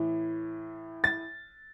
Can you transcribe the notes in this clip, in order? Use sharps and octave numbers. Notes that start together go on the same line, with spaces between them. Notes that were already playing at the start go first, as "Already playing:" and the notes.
Already playing: A2 E3
A6